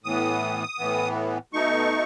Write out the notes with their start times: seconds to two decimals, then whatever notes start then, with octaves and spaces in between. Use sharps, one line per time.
0.04 A2 E3 B3 D#6
0.78 A2 E3 B3
1.53 B2 A3 D#4 C#6